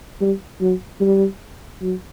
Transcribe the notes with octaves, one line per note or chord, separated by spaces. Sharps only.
G3
F#3
G3
F#3